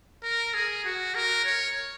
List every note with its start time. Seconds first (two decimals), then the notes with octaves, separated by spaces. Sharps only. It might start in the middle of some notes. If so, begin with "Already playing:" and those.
0.23 A#4
0.54 G#4
0.85 F#4
1.15 A#4
1.45 C#5